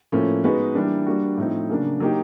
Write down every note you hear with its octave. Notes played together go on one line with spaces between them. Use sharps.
A2 F3 A#3 C#4
G#3 B3 D#4 F#4 B4
E3 G3 A#3 D4
G3 A#3 D4 F#4
A2 F3 A3 C4 D#4
C#3 F#3 A#3 D4
F#3 A#3 D#4 G4